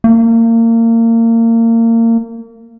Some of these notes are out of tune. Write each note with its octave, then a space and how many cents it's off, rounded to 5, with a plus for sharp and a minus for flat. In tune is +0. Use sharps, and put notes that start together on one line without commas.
A#3 -30